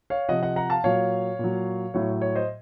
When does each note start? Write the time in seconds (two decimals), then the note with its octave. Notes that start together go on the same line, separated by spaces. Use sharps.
0.10 C#5 F5
0.29 C3 F3 D#5 F#5
0.43 D#5 F#5
0.56 F#5 A#5
0.70 F5 A5
0.84 A#2 F#3 C#5 F5
1.39 A#2
1.44 F#3
1.94 A2 F#3 C#5
2.22 C#5
2.35 C5 D#5